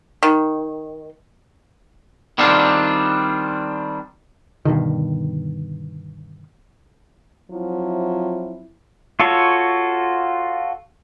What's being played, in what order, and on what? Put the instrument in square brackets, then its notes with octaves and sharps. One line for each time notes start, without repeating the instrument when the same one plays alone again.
[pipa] D#3
[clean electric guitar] D#3 G3 C4 D4 F4
[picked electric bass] G2 B2 D3 D#3
[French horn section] F3 F#3 C4 E4
[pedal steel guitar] F4 F#4 A4 C#5